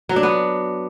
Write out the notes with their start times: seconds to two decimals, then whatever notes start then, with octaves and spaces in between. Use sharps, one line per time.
0.09 F#3
0.16 D4
0.23 B3